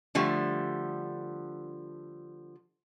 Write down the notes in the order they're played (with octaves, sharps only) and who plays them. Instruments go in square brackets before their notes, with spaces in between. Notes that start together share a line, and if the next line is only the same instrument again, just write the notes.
[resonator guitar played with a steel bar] D3 F3 G3 A3